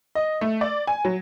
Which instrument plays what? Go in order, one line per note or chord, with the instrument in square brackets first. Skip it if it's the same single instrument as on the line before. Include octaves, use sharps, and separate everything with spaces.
[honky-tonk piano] D#5
A3
D5
G#5
F#3